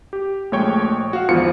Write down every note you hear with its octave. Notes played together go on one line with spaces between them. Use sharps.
G4
A#1 G#3 A3 C#5 G5 C#6
F#4 F5
G#1 E2 F3 F4 C#7